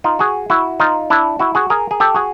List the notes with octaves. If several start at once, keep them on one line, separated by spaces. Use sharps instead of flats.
D#4 F4
F#4 G#4
E4 F#4
D#4 F4
D4 E4
E4 F#4
F#4 G#4
G#4 A#4
G#4
G4 A4
F#4 G#4